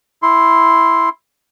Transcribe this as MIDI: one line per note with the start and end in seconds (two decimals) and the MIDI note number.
0.23 1.09 64
0.23 1.09 84